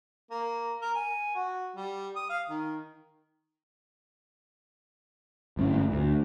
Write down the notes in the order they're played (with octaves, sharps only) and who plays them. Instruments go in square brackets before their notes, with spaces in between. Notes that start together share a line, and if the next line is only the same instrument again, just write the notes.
[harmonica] A#3
A#4
G#5
F#4
G3
D#6
F5
D#3
[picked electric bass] G1 A2 C#4
D2